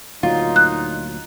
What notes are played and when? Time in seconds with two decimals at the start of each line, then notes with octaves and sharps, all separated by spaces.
0.23 D2 A#2 F#3 D#4 F4
0.56 F#6